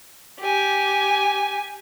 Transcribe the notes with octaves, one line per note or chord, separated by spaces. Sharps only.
G4 G#5